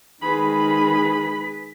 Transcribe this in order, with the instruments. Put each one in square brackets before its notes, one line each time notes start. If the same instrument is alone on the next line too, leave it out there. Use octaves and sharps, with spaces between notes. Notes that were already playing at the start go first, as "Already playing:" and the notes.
[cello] D#3 G#3 [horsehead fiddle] G#4 B4 [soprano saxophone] B5 [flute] B6